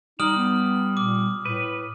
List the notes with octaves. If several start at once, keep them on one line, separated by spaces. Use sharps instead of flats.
G3 D#4 D#6 F6 F#7
B3
A#2 D6
A2 B4